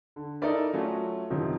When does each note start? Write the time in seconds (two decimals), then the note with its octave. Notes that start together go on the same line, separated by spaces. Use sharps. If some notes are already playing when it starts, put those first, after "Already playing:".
0.16 D3
0.42 D#4 E4 A4 A#4 D5 E5
0.73 F#3 A3 C#4 F4
1.30 F#2 C3 D#3 F3